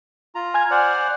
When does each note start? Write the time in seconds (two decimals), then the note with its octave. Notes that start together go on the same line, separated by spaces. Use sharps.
0.35 F4 A#5
0.54 G#5 F6 G#6
0.71 C5 D5 F#5